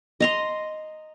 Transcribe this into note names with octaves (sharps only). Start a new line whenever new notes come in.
D#5 A#5 C6